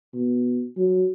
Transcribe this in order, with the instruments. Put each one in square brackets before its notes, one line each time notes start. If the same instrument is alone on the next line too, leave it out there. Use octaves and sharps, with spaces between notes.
[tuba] B2
F#3